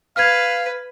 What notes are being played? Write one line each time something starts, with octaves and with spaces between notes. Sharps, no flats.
B4 F5 F6 G#6